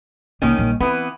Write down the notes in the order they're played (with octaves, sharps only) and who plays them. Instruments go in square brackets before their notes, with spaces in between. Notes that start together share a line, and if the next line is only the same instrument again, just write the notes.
[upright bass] C2 A#3 [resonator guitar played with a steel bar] D#3 C#4
[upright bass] A#1 G3
[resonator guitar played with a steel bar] E3 B3 [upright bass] C4